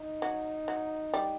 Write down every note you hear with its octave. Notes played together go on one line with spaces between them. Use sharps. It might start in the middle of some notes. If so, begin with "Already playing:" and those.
Already playing: D#4
F#3
F#3
G3